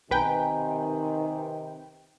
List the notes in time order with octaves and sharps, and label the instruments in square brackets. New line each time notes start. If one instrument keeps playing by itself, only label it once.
[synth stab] B1 B4 G5 [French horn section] C3 D#3 [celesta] G#5 A#5